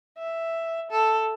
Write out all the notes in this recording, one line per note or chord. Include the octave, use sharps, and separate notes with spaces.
E5
A4